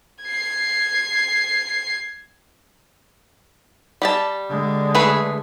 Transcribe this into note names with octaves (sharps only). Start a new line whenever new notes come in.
G#6 C7
G3 G4 A5
D3 G#3
A3 G#4 B4